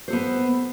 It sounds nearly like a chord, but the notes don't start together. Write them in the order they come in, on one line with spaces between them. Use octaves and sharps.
C5 A4 B3